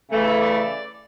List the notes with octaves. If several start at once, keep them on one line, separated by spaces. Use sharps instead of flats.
C#3 E3 A3
E5
D5